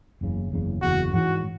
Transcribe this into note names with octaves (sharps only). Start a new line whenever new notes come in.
F#1 E2 C#3
F#1 E2 C#3
F#1 E2 C#3 F#4
G#2 E3 G#3 C#4 F#4